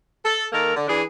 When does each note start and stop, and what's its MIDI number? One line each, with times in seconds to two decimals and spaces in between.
0.24 0.46 69
0.53 0.75 51
0.53 0.75 58
0.53 0.75 69
0.53 0.75 70
0.76 0.86 50
0.88 1.03 52
0.88 1.03 62
0.88 1.03 68